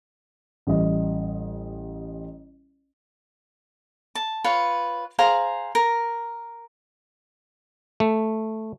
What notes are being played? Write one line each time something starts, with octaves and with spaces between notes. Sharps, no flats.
A1 G3 D#5
A5
F4 B4 C#5
G#4 C5 F5 A#5
A#4
A3